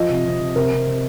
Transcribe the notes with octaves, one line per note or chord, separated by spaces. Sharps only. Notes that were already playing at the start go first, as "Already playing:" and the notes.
Already playing: F3 D#5
C3
C3
C3
C3 A#4
C3
C3